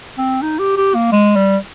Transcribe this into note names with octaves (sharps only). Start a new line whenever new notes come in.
C4
D#4
G4
G4
A#3
G#3
G3